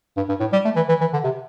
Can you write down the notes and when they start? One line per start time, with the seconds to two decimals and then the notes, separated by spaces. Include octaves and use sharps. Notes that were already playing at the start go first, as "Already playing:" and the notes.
0.16 G2
0.29 G2
0.40 A2
0.52 G3
0.65 A3
0.76 E3
0.89 E3
1.01 E3
1.13 D3
1.24 C3